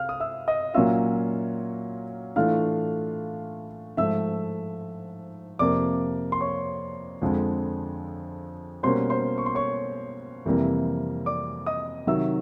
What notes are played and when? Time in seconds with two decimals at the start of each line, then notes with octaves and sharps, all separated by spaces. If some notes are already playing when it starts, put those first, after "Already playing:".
Already playing: C3 F5 F6
0.09 D#6
0.20 E5 E6
0.48 D#5 D#6
0.74 A#2 F#3 A#3 C#4 F4 E5 E6
2.36 A2 E3 A3 D4 F4 F5 F6
3.97 G#2 F3 A3 E5 E6
5.59 F2 C3 F3 A#3 D5 D6
6.32 C6
6.41 C#5 C#6
7.22 F2 D3 F3 G#3
8.83 B2 G3 A#3 C#4 C5 C6
9.10 C5 C6
9.38 C#6
9.46 C6
9.55 C#5 C#6
10.45 F2 C3 E3 G3 A#3
11.26 D5 D6
11.66 D#5 D#6
12.07 C3 D#3 F#3 E5 E6